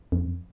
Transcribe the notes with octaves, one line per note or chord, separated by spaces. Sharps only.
F2